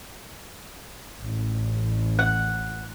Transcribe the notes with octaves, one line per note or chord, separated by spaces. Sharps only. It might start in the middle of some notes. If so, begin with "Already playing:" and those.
A1
F#5